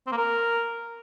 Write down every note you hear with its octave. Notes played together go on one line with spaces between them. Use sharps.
C4
A#3
A#4